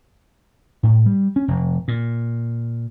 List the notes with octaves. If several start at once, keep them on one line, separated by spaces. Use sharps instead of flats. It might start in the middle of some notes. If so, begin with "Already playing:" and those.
A2
G3
C#4
F1
A#2